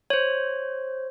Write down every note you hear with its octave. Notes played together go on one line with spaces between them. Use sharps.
C5 C#5